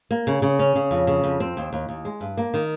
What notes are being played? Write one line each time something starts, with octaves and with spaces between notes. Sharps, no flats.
A#3
C#3
C#3
C#4
C#3
F2
C#3
F2
C4
D#2
D#2
D#2
G#3
G2
A#3
D#3